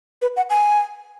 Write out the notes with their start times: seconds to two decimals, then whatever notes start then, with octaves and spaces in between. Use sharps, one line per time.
0.22 B4
0.36 F#5
0.50 G#5